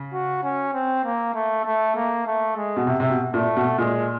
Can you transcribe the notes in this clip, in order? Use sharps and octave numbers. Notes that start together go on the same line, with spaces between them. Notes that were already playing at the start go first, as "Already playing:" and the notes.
Already playing: C#3
F#4
C#4
C4
A#3
A3
A3
A#3
A3
G#3
B2
C3
C3
B2
A#2 A3
B2
A#2 G#3